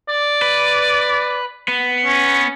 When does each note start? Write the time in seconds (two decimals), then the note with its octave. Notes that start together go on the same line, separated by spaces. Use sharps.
0.09 D5
0.42 B4
1.68 B3
2.06 C#4